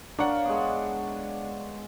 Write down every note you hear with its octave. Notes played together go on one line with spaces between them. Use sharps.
D4 A#4 C#5 F5 F#5
G#3 B3